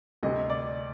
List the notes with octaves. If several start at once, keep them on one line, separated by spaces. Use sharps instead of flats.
D2 C3 G3 D#5
D5